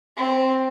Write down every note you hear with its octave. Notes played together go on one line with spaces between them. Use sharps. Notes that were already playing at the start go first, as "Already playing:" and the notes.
C4